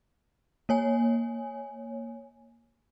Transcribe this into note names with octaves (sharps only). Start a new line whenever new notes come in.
A#3 C#5 G#5